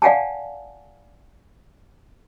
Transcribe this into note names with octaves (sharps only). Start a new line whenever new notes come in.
D5 F5 F#5 G#5 A5